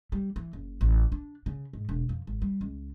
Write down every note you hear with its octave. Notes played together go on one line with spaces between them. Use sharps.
G3
E3
F#1
A1
D4
C#3
G#2
E1
F2
G#1
G3
C#2